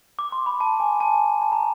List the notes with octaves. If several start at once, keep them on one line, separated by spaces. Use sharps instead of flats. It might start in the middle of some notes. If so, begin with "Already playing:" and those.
D6
C6
B5
A5
G#5
A5
A5
A#5